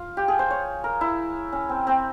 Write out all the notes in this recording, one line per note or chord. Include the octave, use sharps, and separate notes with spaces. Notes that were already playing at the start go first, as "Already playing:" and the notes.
Already playing: F4
G4
G#4
C5
C#5
A#4
E4
C#4
C4
C4